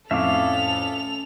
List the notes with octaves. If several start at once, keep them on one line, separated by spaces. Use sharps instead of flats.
F2 A2 C#4 A4 E5 F5 D6 F7